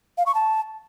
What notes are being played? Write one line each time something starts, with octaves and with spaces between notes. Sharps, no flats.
F5
C#6
A5